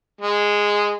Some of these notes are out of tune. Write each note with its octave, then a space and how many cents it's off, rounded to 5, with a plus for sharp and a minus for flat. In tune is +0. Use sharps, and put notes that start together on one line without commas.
G#3 -10